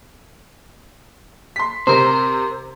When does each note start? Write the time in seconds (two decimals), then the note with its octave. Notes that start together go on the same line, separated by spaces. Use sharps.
1.56 C6 B6
1.87 C3 C4 A#4 C5